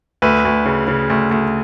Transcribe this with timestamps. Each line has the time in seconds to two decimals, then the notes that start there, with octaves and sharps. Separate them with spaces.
0.22 D2 B4
0.45 D2
0.65 C#3
0.88 C#3
1.10 D2
1.31 D2